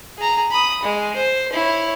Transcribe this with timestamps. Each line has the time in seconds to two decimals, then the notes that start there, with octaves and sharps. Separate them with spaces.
0.17 G#4 A#5
0.51 B5 D#6
0.83 G#3
1.16 C5
1.53 E4 C#5